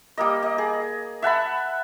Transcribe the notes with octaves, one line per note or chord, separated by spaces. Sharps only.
G3 A#3 D#5
D#5
G#4
E5 F#5 A5 B5